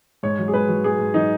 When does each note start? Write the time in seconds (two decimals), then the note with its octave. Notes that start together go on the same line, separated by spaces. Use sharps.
0.23 G#2 C#5
0.39 F#3
0.48 G#4
0.53 G#2 B4
0.69 F#3
0.84 G#2 G#4
0.99 G#2
1.14 F#3 D#4